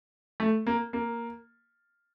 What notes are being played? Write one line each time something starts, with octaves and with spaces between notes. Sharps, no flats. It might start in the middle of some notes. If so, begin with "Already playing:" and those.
A3
A#3
A#3